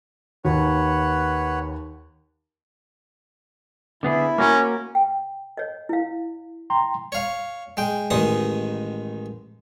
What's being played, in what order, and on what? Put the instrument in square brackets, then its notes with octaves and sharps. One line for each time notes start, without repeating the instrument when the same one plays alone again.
[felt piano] D#2 [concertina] B4 C#5 F#5
[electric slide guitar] D3 B3 G#4 [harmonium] E4
[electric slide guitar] A#3 F#4 A#4 [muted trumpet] C#4
[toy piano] G5
C#5 D#5
E4 F5
[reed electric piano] G5 A#5 C6
[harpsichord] C#5 F5
G#3 G5
A1 D#3 G#3 D#6